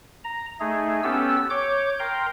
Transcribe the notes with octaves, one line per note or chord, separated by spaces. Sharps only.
A#5
A3 D#4 G#4
B3 C#4 G4 A4 E6
C#5 D6 G6
A#4 G5 A#5 C6